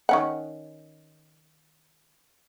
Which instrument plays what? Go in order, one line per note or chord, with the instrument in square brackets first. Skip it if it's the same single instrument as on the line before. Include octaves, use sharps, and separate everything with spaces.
[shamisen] D#3 C#4 F#5